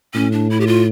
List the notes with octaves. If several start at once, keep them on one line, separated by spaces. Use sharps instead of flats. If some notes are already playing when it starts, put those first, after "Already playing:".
A2 C#4
D4
E4
G4
F4